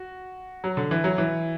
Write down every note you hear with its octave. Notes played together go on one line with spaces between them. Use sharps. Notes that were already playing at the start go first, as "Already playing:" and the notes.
Already playing: F#4
F#3
D3
E3
F#3
E3